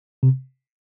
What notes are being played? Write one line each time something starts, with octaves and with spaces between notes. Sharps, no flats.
C3